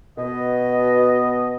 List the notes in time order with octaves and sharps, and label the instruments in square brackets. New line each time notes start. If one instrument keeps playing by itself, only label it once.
[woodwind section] B2 D#5